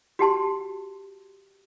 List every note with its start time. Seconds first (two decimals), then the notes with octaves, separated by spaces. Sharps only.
0.19 F#4 G4 A5 C6